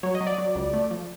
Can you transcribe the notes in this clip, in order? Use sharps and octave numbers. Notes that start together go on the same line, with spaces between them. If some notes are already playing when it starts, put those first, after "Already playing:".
F#3 C#5
D#5
F#3
D5
F#3
C#2
A3
F3